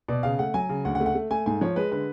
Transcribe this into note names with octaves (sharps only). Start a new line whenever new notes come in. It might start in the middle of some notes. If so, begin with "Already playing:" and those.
B2 D5
C#3 F5
A3 F#5
F#3 G#5
C#3
D2 F#5
F#5
A3
F#5
A3
A3 G#5
G#2 G#5
F3 C#5
G#3 B4
D3 B4